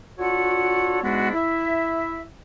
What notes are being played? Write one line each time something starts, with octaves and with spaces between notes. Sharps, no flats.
D4 F4 F#4 A4 C#5 F#5
G#2 G#3 B3 D4 E4 F#4
E4 E5